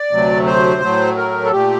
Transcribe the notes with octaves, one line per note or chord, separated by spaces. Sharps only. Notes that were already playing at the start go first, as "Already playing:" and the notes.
Already playing: D5
D2 C3 F#3 A3
C5
A2 F#3 A3
A#4
A4
A#2 A3 G4